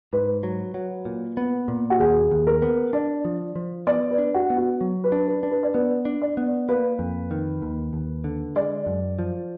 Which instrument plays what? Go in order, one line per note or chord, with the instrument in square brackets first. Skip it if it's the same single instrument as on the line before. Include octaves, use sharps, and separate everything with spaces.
[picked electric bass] G#2 [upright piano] B4
[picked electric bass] F#3
F#3
A#2
B3
A#2
[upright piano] F#4
[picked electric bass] D#2 [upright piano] G#4
[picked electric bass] D#2
[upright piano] A#4
[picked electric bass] B3
[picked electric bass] D4 [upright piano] D5
[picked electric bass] F3
F3
[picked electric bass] B3 [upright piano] D5
[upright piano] B4
[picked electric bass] D4
[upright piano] F#4
[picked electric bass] B3
[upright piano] F#4
[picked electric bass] F#3
[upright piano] B4
[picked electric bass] D4
[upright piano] B4
[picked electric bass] D4
[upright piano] B4
D5
[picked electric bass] B3 [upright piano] B4
[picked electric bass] D4
[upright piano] D5
[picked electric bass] B3
[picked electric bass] A#3 [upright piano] B4
[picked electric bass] F2
D#3
D#2
D#2
D3
[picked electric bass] G#3 [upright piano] D5
[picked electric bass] F#2
F3